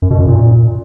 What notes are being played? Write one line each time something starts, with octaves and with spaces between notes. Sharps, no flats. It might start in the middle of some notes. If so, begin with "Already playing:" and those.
F#2
B2
F#2
A#2